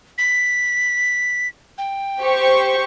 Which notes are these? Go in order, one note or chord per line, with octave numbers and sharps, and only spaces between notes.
B6
G5
G4 C5 C#6